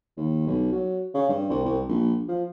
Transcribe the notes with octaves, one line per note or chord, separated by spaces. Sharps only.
D#2
B1
F#3
C#3
G2
C2
C2
A#1
F3